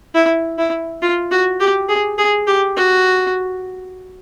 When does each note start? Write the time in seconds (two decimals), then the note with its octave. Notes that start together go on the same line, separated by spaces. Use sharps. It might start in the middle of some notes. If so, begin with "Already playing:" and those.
0.14 E4
0.58 E4
1.02 F4
1.31 F#4
1.60 G4
1.89 G#4
2.18 G#4
2.47 G4
2.77 F#4